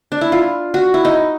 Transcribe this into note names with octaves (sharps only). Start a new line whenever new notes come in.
D4
E4
F4
F#4
E4
D#4